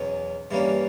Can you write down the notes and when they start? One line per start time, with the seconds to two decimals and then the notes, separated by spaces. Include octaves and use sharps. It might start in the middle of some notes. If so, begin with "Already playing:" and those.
Already playing: E2 B2 F#3 C#4
0.51 G2 E3 G3 A#3 C#4